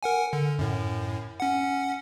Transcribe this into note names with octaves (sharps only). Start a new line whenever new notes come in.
A#4 F#5 G#5
D3
F#2 A2
C#4 F#5